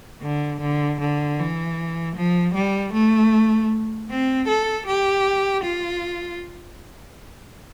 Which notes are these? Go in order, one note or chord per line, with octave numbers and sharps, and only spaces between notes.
D3
D3
D3
E3
F3
G3
A3
C4
A4
G4
F4